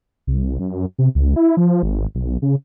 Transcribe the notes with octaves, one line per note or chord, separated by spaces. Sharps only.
C2
F#2
C3
C#2
E4
F3
G#1
B1
C#3